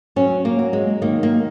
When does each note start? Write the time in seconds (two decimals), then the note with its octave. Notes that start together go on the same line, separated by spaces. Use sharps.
0.16 F#3 C#4
0.45 A#3
0.59 F#3
0.73 G#3
1.02 D#3 A#3
1.23 A#3